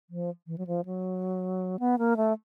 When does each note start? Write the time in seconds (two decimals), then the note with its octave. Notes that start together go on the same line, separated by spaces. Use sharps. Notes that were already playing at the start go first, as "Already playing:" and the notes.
0.10 F3
0.47 E3
0.58 F#3
0.67 F3
0.85 F#3
1.79 B3
1.99 A#3
2.17 A3